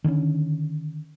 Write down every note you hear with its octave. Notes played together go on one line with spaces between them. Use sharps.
D3 D#3 C4 C#4